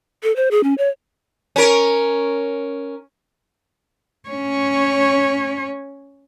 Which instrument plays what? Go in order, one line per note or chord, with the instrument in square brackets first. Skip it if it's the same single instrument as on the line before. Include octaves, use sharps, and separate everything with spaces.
[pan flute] A4
C5
G#4
C#4
C#5
[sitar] C#4 A#4
[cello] C#4 C#5